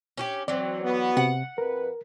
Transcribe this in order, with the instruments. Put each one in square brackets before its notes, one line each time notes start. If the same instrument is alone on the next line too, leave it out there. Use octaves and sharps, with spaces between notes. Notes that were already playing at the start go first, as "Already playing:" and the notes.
[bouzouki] C#4 F#4 G4
[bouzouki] E3 F#3 [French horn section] C4 [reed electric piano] D5
[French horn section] B3 F#4
[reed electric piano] C3 [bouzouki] F#5
[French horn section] F2 B4 [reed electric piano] A#4